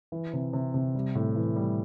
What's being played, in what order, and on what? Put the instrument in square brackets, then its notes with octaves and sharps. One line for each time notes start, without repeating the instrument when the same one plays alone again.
[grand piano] E3
C3
C3
C3
G3
A2
E3
G3